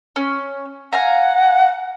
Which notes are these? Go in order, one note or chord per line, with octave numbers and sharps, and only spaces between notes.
C#4
F5 F#5 G#5 A#5